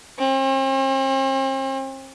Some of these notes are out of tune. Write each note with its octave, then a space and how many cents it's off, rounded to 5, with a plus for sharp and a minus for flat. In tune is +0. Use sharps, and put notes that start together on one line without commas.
C4 +45